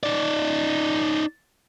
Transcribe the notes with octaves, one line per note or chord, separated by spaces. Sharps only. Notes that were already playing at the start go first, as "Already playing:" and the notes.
D#4 D5